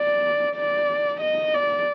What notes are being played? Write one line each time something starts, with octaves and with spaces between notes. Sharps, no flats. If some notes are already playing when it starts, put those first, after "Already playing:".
Already playing: D5
D5
D#5
D5